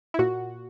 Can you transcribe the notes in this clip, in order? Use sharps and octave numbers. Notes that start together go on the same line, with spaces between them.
E4
A#2 F#4